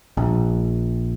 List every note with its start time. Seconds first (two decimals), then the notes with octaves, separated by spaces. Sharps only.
0.17 A#1